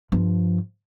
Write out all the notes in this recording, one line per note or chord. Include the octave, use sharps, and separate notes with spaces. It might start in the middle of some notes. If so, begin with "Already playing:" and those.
G2 F3